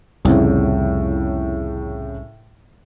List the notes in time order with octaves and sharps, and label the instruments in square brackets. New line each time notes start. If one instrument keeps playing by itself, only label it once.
[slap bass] C2 F2 [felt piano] A2 C#3